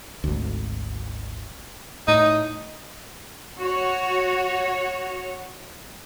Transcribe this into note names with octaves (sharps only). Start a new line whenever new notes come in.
G#1 D2
A2 D#4
F#4 C#5